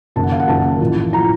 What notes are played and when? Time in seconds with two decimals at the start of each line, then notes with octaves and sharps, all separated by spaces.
0.16 F#1 F#2 D#3 A5
0.23 F#5
0.32 F5
0.40 F#5
0.48 F#1 F#2 D#3 A5
0.80 A1 A2 F3
1.13 A2 F3 A#5